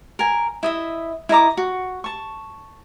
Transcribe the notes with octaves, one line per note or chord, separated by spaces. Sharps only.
A#4 G#5
E4 D#5 E5
E4 D#5 A#5 D6
F#4
A5 C#6